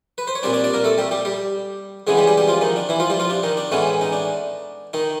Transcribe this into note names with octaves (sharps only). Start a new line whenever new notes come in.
B4
C5
C#5
A#2 G3 C4 D4 D5
D4 D5
D4 D5
A#3 A#4
A3 A4
G3 G4
G3 G4
G3 G4
C#3 E3 G#3 B3 G#4
G3 G4
G3 G4
G3 G4
F3 F4
D#3 D#4
D4
E3 E4
F3 F4
G3 G4
F3 F4
D4
D#3 D#4
D4
A2 E3 G#3 B3 C#4
D#4
D4
D#3 D#4